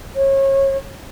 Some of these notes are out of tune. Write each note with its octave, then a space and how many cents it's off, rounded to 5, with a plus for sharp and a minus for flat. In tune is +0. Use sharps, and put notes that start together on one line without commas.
C#5 -30